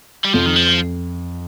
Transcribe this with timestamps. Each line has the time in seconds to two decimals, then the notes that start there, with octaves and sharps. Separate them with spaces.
0.25 G3
0.33 F2 F3
0.46 D#3
0.56 F3